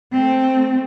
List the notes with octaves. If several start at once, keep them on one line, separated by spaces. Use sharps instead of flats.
A3 C4